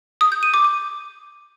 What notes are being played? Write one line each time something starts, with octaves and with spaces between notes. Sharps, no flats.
D#6
G6
D#7
D6
D6